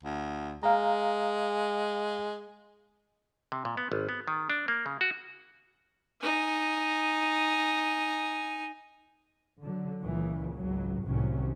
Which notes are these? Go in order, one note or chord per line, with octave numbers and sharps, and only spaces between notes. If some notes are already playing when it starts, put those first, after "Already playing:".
D2
G#3 F5 A#5
C3
A#2
B3
G#1
B3
D#3
D4
A#3
C#3
F#4
D#4 G#5
D3 F#3
C#2 A#2 C#3 E3
G#1 C#2 F#3
C2 A2 C3 D#3 F#3 C#4